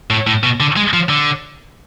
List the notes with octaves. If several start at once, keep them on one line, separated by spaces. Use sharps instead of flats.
A2
A2
B2
D3
G#3
F3
D3